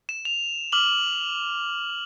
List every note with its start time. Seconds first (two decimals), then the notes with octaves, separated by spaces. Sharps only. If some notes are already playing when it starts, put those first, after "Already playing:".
0.09 E7
0.25 F7
0.72 D6 F6 F#7